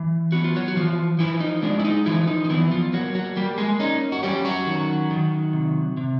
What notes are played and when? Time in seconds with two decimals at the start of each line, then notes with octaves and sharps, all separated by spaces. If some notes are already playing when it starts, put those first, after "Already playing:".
Already playing: E3
0.32 B3 F#4
0.44 F4
0.56 F#3 F#4
0.68 F#4
0.76 E3 F3 F4
1.19 E3 F3 E4
1.41 D#4
1.63 G#3 D4
1.80 E4
1.85 D#4
2.06 E3 F3 E4
2.27 D#4
2.45 D#4
2.50 E3 B3 E4
2.71 F3 F4
2.93 F#3 A#3 F#4
3.15 F#3 F#4
3.36 G3 A#3 G4
3.58 G#3 G#4
3.80 C#4 D#4
4.12 F#4
4.23 G3 C#4 G4
4.45 F#3 F#4
4.67 D#3
5.11 D#3
5.53 C3
5.97 C3